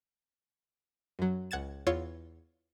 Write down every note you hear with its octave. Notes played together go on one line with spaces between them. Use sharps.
F#2 F#3
C#2 F#5 G#6 A6 E7
E2 F4 C#5 C6 E6